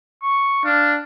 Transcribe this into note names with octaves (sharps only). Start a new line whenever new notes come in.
C#6
D4 F5